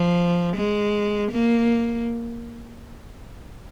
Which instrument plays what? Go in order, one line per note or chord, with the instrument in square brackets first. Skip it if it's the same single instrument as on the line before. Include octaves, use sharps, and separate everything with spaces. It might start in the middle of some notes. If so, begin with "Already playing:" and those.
Already playing: [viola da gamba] F3
G#3
A#3